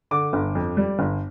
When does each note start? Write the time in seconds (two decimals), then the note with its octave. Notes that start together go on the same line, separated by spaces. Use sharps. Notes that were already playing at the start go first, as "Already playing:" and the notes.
0.11 D3 D6
0.33 G1
0.55 F2
0.77 G3
0.99 G1